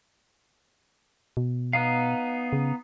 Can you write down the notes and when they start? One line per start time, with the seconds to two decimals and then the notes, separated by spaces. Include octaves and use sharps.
1.37 B2
1.73 B3 D#4 F5
2.53 C#3